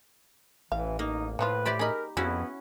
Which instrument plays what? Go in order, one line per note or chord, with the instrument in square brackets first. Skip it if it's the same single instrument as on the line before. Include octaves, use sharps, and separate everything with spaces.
[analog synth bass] A1 [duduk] E3 [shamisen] F5
[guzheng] A#3 [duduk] D#4
[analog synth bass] A2 [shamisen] D#3 F3 F4 [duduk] B4
[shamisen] E4 C5 [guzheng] G4 D5 B5
[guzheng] D#4 B5 [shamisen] G#4 D#5 [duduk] A#4
[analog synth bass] F2 [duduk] B3 [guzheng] C#4 E4 F#4 [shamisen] G#4